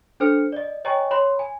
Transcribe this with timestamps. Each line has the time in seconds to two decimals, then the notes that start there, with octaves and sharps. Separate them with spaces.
0.20 D4 A4 C5 F6 C#7
0.52 D5 D#5
0.85 C#5 D#5 G5 G#5 A#5 C#6
1.11 C#5 B5 C6
1.39 G#5